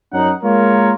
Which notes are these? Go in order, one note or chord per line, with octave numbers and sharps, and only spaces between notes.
F#2 C#4 D#4 F#5
G#3 A#3 F4 A#4 C#5